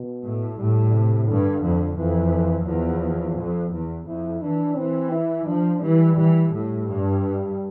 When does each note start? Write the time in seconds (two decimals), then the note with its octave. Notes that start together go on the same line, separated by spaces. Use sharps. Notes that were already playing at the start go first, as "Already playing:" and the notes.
Already playing: B2
0.23 A2
0.57 A2 G3
0.92 C3
1.27 G2 D3
1.62 F2
1.97 F2 E3
2.67 E2 F3
3.37 F2
3.72 E2
4.07 F2 E4
4.41 E3 D4
4.77 E3 C4
5.12 E4
5.47 F3 D4
5.81 E3 G3
6.16 E3 G3
6.51 A2
6.87 G2